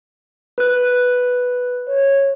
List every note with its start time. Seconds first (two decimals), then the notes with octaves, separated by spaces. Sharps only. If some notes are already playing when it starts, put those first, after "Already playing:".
0.58 B4 F#6
1.88 C#5